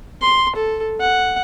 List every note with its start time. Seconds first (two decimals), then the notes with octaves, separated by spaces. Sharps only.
0.21 C6
0.55 A4
1.00 F#5